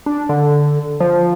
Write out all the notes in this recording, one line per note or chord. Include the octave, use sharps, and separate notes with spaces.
D4
D3
F3